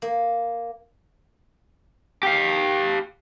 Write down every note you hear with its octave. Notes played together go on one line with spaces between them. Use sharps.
A#3
G4 F5